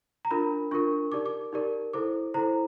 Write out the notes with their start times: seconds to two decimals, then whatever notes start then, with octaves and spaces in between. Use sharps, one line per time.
0.25 A#5
0.31 D4 F4 A#4 B5
0.71 D4 F4 A#4 C#6
1.12 D#4 G4 A#4 D5 D6
1.26 D6
1.53 D#4 G4 A#4 D5
1.93 E4 A4 C5 D6
2.34 E4 A4 C5 A#5